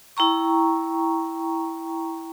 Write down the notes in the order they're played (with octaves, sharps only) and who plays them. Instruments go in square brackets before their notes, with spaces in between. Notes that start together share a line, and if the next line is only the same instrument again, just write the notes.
[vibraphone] E4 G5 A#5 C#6